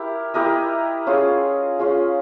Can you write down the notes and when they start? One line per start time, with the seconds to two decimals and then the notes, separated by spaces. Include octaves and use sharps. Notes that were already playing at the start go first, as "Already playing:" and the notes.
Already playing: E4 G4 A#4
0.34 E4 G4 A#4 D#5
1.07 C#4 F4 G#4
1.79 C#4 F4 G#4